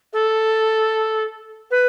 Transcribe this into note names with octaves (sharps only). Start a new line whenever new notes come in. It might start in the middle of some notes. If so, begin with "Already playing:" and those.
A4
B4